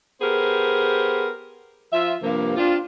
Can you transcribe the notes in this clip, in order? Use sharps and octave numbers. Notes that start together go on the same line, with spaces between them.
B3 G4 G#4 A#4 C5
F3 F4 E5
G2 C3 F3 A#3
C4 D4 F4